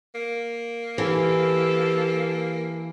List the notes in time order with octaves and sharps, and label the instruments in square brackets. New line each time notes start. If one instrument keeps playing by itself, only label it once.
[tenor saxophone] A#3
[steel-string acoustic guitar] E3 [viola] G4 A4